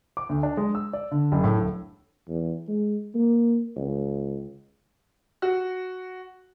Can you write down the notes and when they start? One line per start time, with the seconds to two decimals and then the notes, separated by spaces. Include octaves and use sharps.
0.17 D6
0.29 D2
0.43 D4
0.57 G#3
0.75 E6
0.93 D5
1.11 D3
1.32 F#1
1.44 A2
1.57 D1
2.28 E2
2.68 G#3
3.15 A#3
3.76 C#2
5.42 F#4